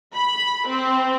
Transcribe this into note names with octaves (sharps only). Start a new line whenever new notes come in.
B5
C4